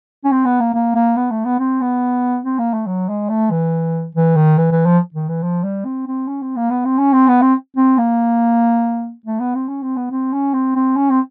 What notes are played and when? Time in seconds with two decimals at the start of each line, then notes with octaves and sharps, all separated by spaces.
0.24 C#4
0.31 C4
0.45 B3
0.60 A#3
0.74 A#3
0.95 A#3
1.16 B3
1.31 A3
1.45 B3
1.59 C4
1.81 B3
2.44 C4
2.58 A#3
2.73 A3
2.86 F#3
3.09 G#3
3.29 A3
3.51 E3
4.15 E3
4.36 D#3
4.57 E3
4.71 E3
4.86 F3
5.14 D#3
5.28 E3
5.43 F3
5.63 G3
5.85 C4
6.07 C4
6.28 C#4
6.42 C4
6.56 A#3
6.70 B3
6.85 C4
6.98 C#4
7.13 C4
7.28 B3
7.41 C4
7.76 C4
7.98 A#3
9.26 A3
9.40 B3
9.55 C4
9.68 C#4
9.82 C4
9.96 B3
10.11 C4
10.33 C#4
10.54 C4
10.75 C4
10.96 C#4
11.10 C4